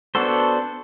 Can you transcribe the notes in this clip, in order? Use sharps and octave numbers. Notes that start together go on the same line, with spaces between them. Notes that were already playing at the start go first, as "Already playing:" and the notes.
B3 D4 F#4 A4 C5